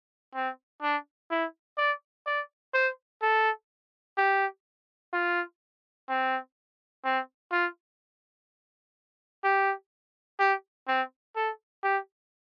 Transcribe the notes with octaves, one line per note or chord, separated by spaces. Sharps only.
C4
D4
E4
D5
D5
C5
A4
G4
F4
C4
C4
F4
G4
G4
C4
A4
G4